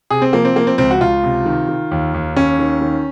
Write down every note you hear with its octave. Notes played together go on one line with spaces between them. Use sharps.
C3 G#4
C4
F3 A#3
C4
F3 A#3
C4
C#2 C4
F#4
C#2 F4
C3
D#3
D#3
D#2
D#2
D#2 C#4
D#3
D#3